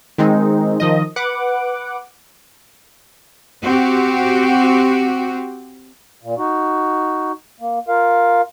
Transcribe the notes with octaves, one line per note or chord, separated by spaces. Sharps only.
D#3 G#3 C4 D#4
D#3 F3 D#5
B4 F#5 D6
C4 F#4 G4
A#2
D#4 F#4
A#3
F4 A#4 F5